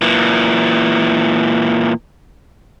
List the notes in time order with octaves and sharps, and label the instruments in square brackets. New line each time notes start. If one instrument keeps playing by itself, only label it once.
[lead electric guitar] A#2 E3